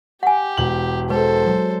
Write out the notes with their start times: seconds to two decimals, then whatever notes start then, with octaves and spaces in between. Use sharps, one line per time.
0.23 G4 F#5 G#5
0.57 E1 F#7
1.10 G#3 A4 B4 C5
1.47 F#3